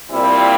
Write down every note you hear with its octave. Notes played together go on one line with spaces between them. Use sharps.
A#2 G3 C4 E4